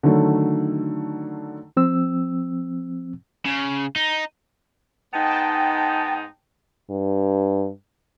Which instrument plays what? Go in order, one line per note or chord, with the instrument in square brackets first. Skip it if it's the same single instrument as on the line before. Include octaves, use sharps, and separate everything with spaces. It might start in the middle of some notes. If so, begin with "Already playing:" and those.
[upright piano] D3 D#3 F#3 A3
[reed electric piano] F3 C4 E6
[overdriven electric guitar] C#3
D#4
[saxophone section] G#2 B3 D#4 [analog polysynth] G5 A5
[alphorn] G2